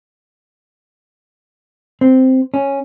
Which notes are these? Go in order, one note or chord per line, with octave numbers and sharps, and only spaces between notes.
C4
C#4